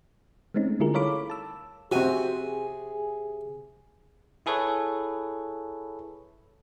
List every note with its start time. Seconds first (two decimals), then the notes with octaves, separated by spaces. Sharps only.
0.54 G#3 A3 C4 C#4 D#4
0.80 D3 G3 E4 F4 G#4 A#4
0.94 A4 A#4 C#5 F5 B5 D6
1.30 A5 E6
1.92 C3 C4 F#4 G#4 G#5
4.46 E4 G#4 A4 B4 C#5